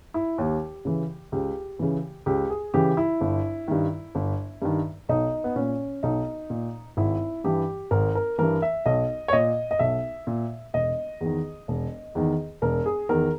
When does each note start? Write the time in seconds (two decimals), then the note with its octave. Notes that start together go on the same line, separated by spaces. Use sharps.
0.14 E4
0.38 D#2 G4
0.85 C#3 E3
1.32 C#2 G4
1.79 C#3 E3
2.26 C#2 G4
2.50 G#4
2.74 C#3 E3 G4
2.97 E4
3.21 G1
3.68 G2 D#3
4.15 G1
4.62 G2 D#3
5.09 B1 D#4
5.44 B3
5.56 A#2 C#4
6.03 B1 D#4
6.50 A#2
6.97 G#1 E4
7.44 G2 E3 G4
7.91 G#1 A#4
8.15 A#4
8.38 G2 E3 A#4
8.62 E5
8.86 B1 D#5
9.28 C#5
9.33 A#2 D#5
9.71 D#5
9.79 B1 E5
10.27 A#2
10.74 E1 D#5
11.21 E2 D#3
11.68 E1
12.15 E2 D#3
12.62 E1 A#4
12.86 G#4
13.09 E2 D#3 A#4